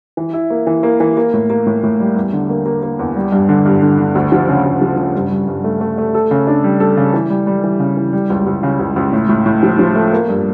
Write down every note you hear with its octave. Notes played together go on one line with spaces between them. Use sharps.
E3
E4
A#3
E3
A#3
E3
A#3
A2
A#3
A2
A2
G3
E2
D3
A#3
A#3
A#3
E2
G3
G2
D3
G2
D3
D3
D2
F3
C#3
D2
F3
C#3
G2
G2
G2
A3
A3
A3
A4
C#3
D4
G3
A4
C#3
E3
G3
G3
E3
C#3
E3
G3
C#2
C#2
C#3
C#2
C#2
A2
A2
A2
F3
F3
A3
A#3
G2